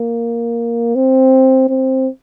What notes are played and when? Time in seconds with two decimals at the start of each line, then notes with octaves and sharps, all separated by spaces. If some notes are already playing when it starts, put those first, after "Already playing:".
Already playing: A#3
0.96 C4
1.69 C4